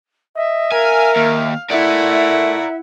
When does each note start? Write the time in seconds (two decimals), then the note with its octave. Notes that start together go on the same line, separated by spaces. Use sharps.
0.36 D#5 E5
0.72 A#4 F5 G#5
1.16 D#2
1.71 A3 E4 A#4 D5 E5 F#5